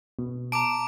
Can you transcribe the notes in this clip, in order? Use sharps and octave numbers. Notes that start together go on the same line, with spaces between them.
B2
A5 A#5 D6 D7